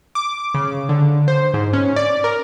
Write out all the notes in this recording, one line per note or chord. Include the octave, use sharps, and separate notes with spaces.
D6
C#3
D3
C5
G#2
C#4
D5
A#4